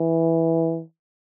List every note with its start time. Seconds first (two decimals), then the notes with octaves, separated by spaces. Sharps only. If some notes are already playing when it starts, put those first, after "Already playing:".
Already playing: E3